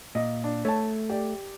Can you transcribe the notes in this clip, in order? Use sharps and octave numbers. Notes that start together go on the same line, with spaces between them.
A#2 D#5
D4
A3 C#5 A5
G4 D5